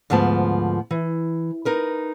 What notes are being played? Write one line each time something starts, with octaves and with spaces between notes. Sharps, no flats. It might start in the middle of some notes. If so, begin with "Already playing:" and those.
D2 G#2 F3 B3 A5
E3
D#4 A#4 B4